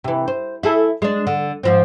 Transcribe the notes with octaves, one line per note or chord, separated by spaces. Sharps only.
C3 E3
C5
E4 G#4 A4
G#3 D4
D3
G#2 F3 C4